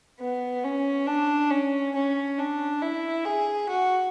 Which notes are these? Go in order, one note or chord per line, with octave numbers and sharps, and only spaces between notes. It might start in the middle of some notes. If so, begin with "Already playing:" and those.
B3
C#4
D4
C#4
C#4
D4
E4
G#4
F#4